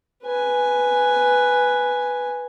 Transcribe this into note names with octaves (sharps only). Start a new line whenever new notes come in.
B4 G#5